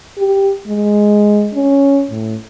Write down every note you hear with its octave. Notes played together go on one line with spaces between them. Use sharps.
G4
G#3
C#4
A2